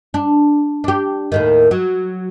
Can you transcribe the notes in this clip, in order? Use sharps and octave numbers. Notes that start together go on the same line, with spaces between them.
D4
D4 G4
D#2 A2 D#3
F#3